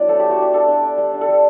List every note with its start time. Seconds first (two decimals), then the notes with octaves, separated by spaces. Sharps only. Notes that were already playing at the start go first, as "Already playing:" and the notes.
Already playing: F#3 B3 D4 E4 D5
0.08 A3 A4
0.20 A3 G4
0.31 F#4
0.38 D4 G4
0.53 D4 A4
0.68 D4
0.83 D4
0.98 G3
1.14 D4
1.21 A4
1.29 G3